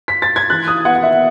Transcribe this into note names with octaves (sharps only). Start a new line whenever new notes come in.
B6
A6
G#6
E3 F#6
D#6
B3 F#5
E5